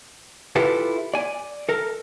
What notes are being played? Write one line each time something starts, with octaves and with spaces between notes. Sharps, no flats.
E4 F4 G4 A4 B4 A5
D5 G#5
A4 A#4